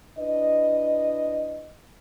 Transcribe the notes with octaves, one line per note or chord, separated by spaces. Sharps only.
D4 E4 B4 D#5